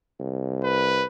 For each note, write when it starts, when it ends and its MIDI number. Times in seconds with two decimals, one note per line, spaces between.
0.20 1.03 36
0.63 1.06 71